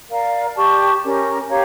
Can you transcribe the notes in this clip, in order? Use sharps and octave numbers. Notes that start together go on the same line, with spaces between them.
A#4 D5 F5
G4 D5 A5 C#6
C#4 G4 A#4
G4 C#5 F5 A#5